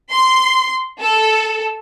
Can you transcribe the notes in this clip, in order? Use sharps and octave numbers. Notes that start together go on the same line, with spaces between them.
C6
A4